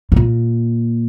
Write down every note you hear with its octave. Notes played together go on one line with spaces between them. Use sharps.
G#2
A#2